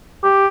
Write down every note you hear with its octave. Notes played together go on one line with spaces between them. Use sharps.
G4